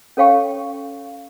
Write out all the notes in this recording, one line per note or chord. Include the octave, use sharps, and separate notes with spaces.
C#4 A4 C#5 F5 G5 C#6